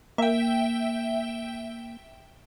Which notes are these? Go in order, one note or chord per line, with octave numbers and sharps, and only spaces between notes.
A#3 E5 G5